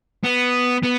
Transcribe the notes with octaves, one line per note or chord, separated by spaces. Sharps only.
B3
B3